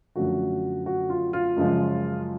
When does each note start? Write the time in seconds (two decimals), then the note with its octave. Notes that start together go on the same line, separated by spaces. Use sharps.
0.16 F#2 D3 F3 A3 F#4
0.86 F#4
1.10 F4
1.33 F4
1.57 F#2 C#3 F3 G#3